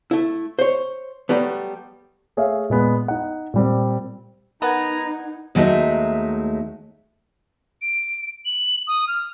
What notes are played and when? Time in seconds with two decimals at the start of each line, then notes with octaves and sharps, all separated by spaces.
0.11 A3 E4
0.59 C5 C#5
1.29 F#3 G3 A3 B3
2.37 A3 G#4 C#5 E5 F5
2.70 A#2 G#3 B3
3.08 D#4 F#5
3.54 A#2 G3 C4
4.62 B3 D#4 A#4 F#5 A#5 G#6
5.55 D#2 F#3 G#3 A3 D#4 E5
7.82 D7
8.46 F#7
8.87 D#6
9.08 F6